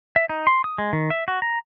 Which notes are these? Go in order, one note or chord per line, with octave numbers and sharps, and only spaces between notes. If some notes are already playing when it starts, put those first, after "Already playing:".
E5
D#4
C6
D#6
G#3
D#3
E5
F#4
A#5